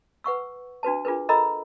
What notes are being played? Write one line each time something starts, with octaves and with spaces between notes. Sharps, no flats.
B4 F#5 C#6 E6
D4 F#4 B4 A5
D4 F4 G#4 A#4 B4
A4 A#4 D#5 A#5 B5 E6